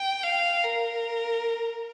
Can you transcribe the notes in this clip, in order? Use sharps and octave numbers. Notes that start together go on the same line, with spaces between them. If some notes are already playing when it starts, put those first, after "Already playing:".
Already playing: G5
F5
A#4